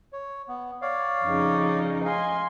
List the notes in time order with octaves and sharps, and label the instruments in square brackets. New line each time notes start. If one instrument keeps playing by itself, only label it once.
[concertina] C#5
B3
C#5 D5 F5
[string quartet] F2 C#3 D#4
[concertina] D#5 F5 [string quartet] G#5 C6